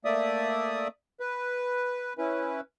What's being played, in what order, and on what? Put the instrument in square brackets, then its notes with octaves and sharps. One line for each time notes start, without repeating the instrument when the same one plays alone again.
[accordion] A3 A#3 D5 E5 D#6
B4
C#4 E4 B4